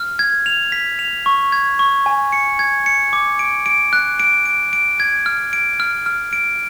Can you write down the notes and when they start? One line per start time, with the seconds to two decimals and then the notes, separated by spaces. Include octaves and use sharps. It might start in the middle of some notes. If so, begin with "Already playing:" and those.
Already playing: F6
0.19 G#6
0.46 F7
0.72 B6
0.99 F7
1.26 C#6
1.52 G#6
1.79 C#6
2.06 G#5
2.32 C#7
2.59 G#6
2.86 C#7
3.13 D6
3.39 D7
3.66 D7
3.93 F#6
4.20 D7
4.46 D7
4.73 D7
5.00 G#6
5.26 F6
5.53 D7
5.80 F6
6.06 F6
6.33 D7